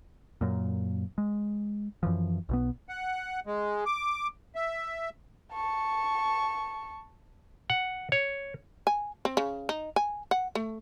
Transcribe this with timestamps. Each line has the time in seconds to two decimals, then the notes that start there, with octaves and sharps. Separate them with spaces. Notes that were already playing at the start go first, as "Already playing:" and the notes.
0.41 F#2 A#2
1.18 G#3
2.03 F#2 E3 F3
2.49 B1 B2 B3
2.88 F#5
3.46 G#3
3.86 D6
4.55 E5
5.53 A5 C#6
7.70 F#5
8.12 C#5
8.87 G#5
9.25 C4
9.37 C#3
9.69 D#4
9.96 G#5
10.31 F#5
10.55 A3